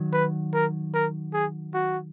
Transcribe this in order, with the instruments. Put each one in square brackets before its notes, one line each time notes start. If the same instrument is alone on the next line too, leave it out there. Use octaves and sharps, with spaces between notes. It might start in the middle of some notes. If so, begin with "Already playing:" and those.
Already playing: [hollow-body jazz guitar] D#3 F#3
[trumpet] B4
A#4
A#4
G#4
F#4